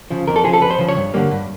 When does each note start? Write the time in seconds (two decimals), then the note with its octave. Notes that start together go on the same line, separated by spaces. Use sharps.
0.10 C#3 F3
0.27 F2 A#4
0.36 A4
0.44 C#3 F3 G#4
0.53 A4
0.61 F2 B4
0.70 C5
0.79 C#3 F3
0.88 C#5
0.96 G2
1.14 D3 G3 A#3
1.31 G2